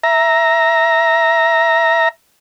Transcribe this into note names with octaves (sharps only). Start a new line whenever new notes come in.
E5 A#5